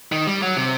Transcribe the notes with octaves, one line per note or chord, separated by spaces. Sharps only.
D#3
G3
F#3
C3